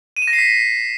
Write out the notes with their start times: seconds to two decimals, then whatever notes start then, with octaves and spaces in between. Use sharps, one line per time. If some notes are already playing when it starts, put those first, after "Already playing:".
0.17 D#7
0.22 E7
0.28 A#6
0.33 C7
0.39 B6